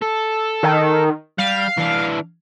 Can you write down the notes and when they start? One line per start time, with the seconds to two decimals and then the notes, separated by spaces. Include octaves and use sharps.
0.02 A4
0.63 D#3
1.38 G3 F5
1.77 E3 D4